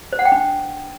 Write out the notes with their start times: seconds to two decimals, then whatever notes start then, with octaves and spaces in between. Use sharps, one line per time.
0.13 C5
0.19 F#5
0.25 G5
0.32 D4